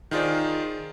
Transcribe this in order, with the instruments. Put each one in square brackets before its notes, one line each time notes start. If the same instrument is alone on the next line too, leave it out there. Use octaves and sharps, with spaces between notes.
[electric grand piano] D#3 D#4 F4 G#4 C5 D5